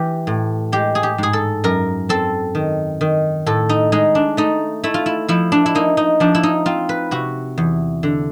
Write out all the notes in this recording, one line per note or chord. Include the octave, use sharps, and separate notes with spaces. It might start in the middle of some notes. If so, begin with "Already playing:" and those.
Already playing: E3 G4
A2
G#3 G4
G#4
G4
G#2 G#4
A4
F#2 A#4
C4 A4
D#3
D#3
A2 A4
D#4
G#3 D#4
D4
A3 D#4
A3 E4
F4
E4
F3 E4
D4
E4
A#3 D#4
D#4
F3 D4
E4
D#4
C4 F4
B4
C3 F#4
E2
D3